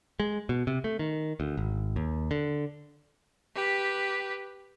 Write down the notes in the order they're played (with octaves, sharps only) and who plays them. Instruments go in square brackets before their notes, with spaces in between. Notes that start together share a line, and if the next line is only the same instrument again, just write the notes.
[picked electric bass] G#3
B2
C3
A3
D#3
D2
G#1
D#2
D3
[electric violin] G4 B4